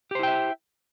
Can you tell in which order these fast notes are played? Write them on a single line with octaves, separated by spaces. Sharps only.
G4 C5 E4 G5 E5